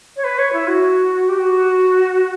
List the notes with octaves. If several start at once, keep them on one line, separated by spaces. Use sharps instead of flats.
C#5
B4
C#5
E4
F#4
G4
F#4